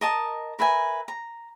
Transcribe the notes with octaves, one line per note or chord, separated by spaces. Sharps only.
A#4 D#5 A5
A#4 B4 E5 G#5
A#5